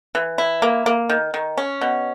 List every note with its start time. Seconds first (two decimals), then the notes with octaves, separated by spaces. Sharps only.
0.15 E3
0.38 E4
0.62 A#3
0.86 A#3
1.09 D#3
1.34 D#3
1.57 C#4
1.81 B2